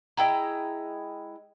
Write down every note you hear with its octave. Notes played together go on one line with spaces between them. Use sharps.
G#3 E4 G5 A#5